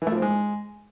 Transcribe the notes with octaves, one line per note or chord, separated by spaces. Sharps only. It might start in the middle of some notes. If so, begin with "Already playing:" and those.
E3
A3
F3
C4
G#3